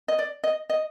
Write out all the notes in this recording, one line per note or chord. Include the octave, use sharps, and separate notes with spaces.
D#5
D5
D#5
D#5